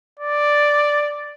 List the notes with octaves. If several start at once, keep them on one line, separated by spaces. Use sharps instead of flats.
D5